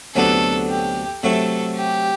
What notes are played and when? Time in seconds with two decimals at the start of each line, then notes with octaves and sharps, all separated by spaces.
0.15 D2 C3 F#3 B3 D4 A4
0.69 G4
1.23 C3 F#3 A3 E4 A4
1.78 G4